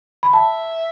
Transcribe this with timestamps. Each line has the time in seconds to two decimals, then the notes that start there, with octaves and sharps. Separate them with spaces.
0.23 B5
0.34 E5 A5